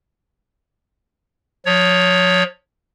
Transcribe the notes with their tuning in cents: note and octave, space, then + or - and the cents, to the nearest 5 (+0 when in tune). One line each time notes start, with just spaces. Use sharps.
F3 +35 C#5 +15